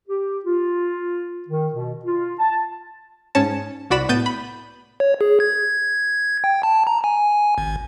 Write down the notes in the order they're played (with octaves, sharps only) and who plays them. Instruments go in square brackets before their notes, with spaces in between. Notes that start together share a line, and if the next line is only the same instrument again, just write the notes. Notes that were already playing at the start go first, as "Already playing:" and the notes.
[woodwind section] G4
F4
D#3
B2
F4
A5
[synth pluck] G#2 C#4 C#5 A5
C2 F#4 D5 B5 E7
A2 B3 G6 A6 D#7
B5
[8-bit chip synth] C#5
G#4
G#6
G5
A5
A#5
G#5
G#1